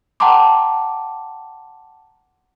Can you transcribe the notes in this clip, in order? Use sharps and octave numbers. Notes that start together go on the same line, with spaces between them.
F#5 G5 A5 A#5 C6 D6